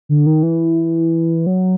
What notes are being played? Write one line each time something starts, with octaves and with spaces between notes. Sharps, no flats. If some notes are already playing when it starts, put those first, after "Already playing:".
D3
D#3
E3
F#3